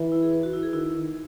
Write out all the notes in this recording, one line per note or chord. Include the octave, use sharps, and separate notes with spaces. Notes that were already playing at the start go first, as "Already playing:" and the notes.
Already playing: E3
E4
G#4
B4
F#4
E4
G#4
D#3 E4
D#3